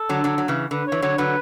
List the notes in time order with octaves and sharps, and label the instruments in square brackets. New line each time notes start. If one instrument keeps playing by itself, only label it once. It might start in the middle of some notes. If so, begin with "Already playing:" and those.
Already playing: [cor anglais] A4
[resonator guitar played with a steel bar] D3 F#3
D3 F#3
F#3
C#3 E3
[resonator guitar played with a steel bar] D3 [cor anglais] B4
[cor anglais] C#5
[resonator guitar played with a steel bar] E3
[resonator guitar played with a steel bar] D3 F#3 [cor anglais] C#5
[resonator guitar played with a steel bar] D3 F#3 [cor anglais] B4